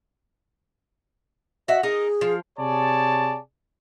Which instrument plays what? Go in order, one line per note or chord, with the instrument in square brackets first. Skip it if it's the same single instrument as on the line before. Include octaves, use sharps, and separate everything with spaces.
[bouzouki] F#4 E5 [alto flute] D#5
[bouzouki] D#4 A#4 D#5 [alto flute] G#4
[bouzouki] F3 F4
[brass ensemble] C3 G#4 C#5 D5 A5